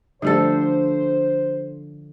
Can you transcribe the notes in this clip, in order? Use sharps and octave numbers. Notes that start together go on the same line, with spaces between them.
D3 F3 G3 A3 G4 A4 C5